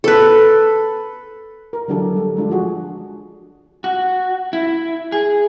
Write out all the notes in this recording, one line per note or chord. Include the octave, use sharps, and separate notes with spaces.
A4 B4
A#4
D3 E3 F#3 D4 G4 A4
G3 A4
G#3 D4 F4
F3 D4 F#4 G#4
F#4
E4
G#4